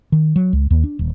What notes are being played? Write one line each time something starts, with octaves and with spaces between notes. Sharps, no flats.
D#3
F#3
C#2
D#2
D4
D#1